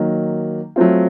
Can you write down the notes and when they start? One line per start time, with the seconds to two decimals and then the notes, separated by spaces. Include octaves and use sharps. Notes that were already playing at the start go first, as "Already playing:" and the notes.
Already playing: D#3 F#3 A#3
0.76 F#3 A3 C4 F4